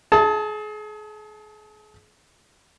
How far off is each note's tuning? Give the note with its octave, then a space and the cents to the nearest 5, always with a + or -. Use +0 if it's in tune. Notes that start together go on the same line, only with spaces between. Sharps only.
G#4 +35 A5 +0